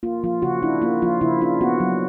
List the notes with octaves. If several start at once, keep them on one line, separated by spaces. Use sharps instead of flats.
A#3 F4
F3 F4
C#3 F#4
D4 E4
A#3 F4
F3 F4
C#3 E4
D4 F4
B3 F#4
F#3